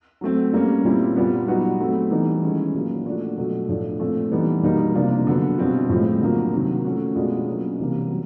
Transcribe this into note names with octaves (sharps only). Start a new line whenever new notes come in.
F#3 A3 C4
G3 A#3 C#4
A#2 G3 C4 E4
A#2 G3 B3
F#3 B3 D#4 F#4
F#3 A3 C4
E3 G3 B3 D#4
D#3 G#3 C#4 E4
A#2 F#3 A#3
F3 A3 D4 F#4
B2 F#3 A3
A2 F3 A3 D4
A#2 F3 A3 C4
E3 G3 B3 D#4
B2 G3 A#3 D#4
C3 F3 A#3 D4 F4
D3 F#3 B3
B2 G3 C4 F4
A2 F3 G#3 C4
D3 F#3 A#3
C3 D#3 F#3
F3 A3 C#4 F#4
B2 G#3 B3 D4 F4
F#3 A#3 C#4
C3 E3 G3 A#3
F#3